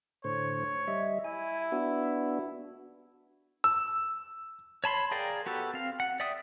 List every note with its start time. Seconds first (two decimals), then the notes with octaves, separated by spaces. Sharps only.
0.24 A2 D3 C5 C#5
0.88 G3 D#5 E5
1.25 E4 G#5
1.72 B3 D4 F#4
3.64 E6
4.84 C#5 A5 B5 C6
5.11 G#4 A#4 D5 F5 G5
5.46 B3 F#4 G4 A4
5.74 C4 F5
6.00 F#5
6.20 D5 E5 G5 D#6